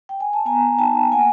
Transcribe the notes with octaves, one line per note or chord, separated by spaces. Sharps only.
G5
G#5
A5
B3 G#5 A#5
D#4 G5 A5
A#3 F#5 G#5